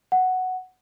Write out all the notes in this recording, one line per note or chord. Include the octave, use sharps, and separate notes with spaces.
F#5